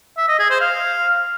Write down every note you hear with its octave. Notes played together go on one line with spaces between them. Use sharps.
E5
D#5
G#4
C5
F5